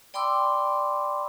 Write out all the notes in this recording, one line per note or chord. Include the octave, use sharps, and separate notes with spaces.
D5 G5 B5 C6 D6 E6